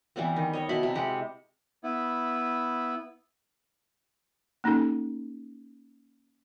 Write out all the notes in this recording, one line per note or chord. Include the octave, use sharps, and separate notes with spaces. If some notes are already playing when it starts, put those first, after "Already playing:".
E3 G3 B3 C4
D#3
C#5 D#5
B2 E4 B5
C3
G#3 G4 F#5
B3 E4
A#3 C#4 D#4 G4 A4